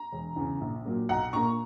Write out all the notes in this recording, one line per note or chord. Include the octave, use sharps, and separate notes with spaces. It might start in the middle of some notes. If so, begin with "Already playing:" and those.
Already playing: A#5
E1
E2 C#3
A#1
A#2 F#3 A#3
B1 F#5 A#5
A#2 A#3 A#5 C#6